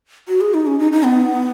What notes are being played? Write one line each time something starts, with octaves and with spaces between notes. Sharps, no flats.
F#4
G#4
D#4
C#4
D#4
D#4
B3